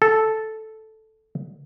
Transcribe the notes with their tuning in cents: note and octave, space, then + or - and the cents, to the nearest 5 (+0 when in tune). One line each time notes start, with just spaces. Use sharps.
A4 -5